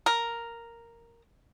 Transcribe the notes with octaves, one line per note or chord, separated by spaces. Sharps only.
A#4